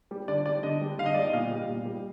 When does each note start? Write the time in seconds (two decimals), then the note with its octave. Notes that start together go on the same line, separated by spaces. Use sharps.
0.11 G3
0.28 D3 D5
0.45 G3 D5
0.63 D3 D#5
0.81 G3
0.98 D3 F5
1.06 D#5
1.14 G3 D5
1.22 D#5
1.33 A#2 F5
1.51 G3
1.69 A#2
1.85 G3